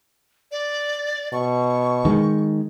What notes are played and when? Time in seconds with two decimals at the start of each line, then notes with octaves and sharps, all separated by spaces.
0.52 D5
1.33 B2 C#6
2.05 D#3 G#3